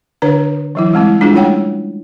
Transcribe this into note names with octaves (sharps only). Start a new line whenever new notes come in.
D3 D4 B4 C#5 A#5
E3 F#3 E4
G3 G#3 C4 E4
G#3 D4 E4 F4 G#4
G3 A3 C#4 C#5 F#5 G5